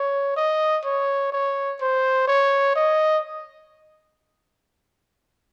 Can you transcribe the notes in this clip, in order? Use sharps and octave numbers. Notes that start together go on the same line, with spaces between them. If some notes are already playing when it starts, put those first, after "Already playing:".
Already playing: C#5
D#5
C#5
C#5
C5
C#5
D#5